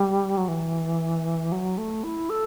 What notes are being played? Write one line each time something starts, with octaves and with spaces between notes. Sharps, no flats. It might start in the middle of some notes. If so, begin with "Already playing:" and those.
Already playing: G3
F#3
E3
F#3
A3
E4
A4